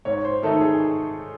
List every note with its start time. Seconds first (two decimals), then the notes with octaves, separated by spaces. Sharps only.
0.05 G#2 C#5
0.25 C5
0.43 D#3 A3 D#4 A4
0.61 G#4